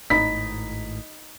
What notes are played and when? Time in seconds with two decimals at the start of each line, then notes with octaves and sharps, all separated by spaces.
0.10 G#1 A2 D#4 B5 B6